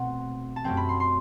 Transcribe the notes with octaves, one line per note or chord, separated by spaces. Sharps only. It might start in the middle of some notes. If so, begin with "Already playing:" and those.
Already playing: B2 A3 C4 F#5
A5
F#2 F#3 A3 C4 G5
B5
C6
C6